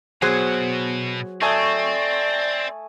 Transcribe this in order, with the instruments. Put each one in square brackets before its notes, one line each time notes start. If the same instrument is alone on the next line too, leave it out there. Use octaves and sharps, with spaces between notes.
[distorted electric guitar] B2 F#5 [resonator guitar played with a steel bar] F#3 G#4 C5 [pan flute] B3
[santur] A3 G#5 D#6 [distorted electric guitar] C4 [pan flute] D5